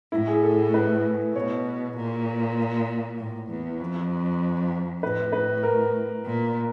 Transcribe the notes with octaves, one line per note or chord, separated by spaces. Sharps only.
A2 E4
G#4
A4
B4
B2 C#5
A#2
A2
E2
F2
A2 B4
B4
A#4
A#2